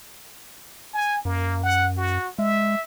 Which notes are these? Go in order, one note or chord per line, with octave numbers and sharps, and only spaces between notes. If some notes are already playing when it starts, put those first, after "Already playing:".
G#5
F#2 A#3
F#5
F#4
G#3 E5